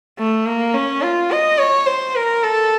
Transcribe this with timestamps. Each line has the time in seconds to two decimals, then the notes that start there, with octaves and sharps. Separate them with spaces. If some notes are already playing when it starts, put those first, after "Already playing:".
0.19 A3
0.46 A#3
0.74 C#4
1.02 F4
1.31 D#5
1.58 C#5
1.87 C5
2.16 A#4
2.44 A4